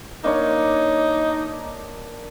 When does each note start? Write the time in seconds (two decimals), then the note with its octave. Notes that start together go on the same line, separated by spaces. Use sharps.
0.24 A#3 D4 D#4 C#5